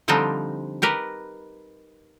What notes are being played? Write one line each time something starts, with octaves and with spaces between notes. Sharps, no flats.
D3 F3 G3 C4 D4 D#4
D#4 G4 A#4 B4